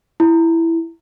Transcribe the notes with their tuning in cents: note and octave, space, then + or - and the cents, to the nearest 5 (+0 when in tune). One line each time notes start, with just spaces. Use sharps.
E4 +5